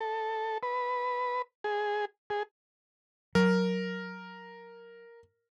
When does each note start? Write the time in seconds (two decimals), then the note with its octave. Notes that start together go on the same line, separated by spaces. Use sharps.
0.01 A4
0.63 B4
1.64 G#4
2.30 G#4
3.35 F#3 A#4